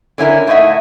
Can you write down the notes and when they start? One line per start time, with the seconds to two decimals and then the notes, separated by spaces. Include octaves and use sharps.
0.18 D3 C#4 E4 A#4
0.47 A2 D#4 B4 D#5 E5 F#5